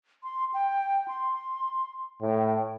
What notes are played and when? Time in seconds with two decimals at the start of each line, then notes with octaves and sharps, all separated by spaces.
0.24 C6
0.54 G5
1.08 C6
2.22 A2 G5